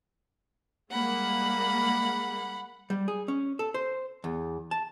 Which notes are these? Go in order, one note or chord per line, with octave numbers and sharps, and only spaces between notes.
G3 G#3 A#3 F#5 B5
G3
G#4
C#4
A4
C5
E2
A5